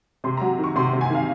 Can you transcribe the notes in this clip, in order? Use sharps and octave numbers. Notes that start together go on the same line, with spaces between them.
C3 C6
F#3 A#5
D#3
C#6
C3 C6
C3
G#5
D#3 F5